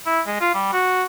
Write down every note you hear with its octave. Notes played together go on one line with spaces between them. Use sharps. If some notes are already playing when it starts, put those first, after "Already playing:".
E4
G#3
F4
G3
F#4